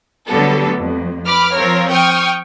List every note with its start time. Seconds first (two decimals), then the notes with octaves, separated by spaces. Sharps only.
0.27 D3 F#3 G3 A3 B3 A4
0.78 F2
1.26 B4 B5 D6 F6
1.55 F3 C4 F4 A#4 C#5
1.90 G5 C#6 D#6 F6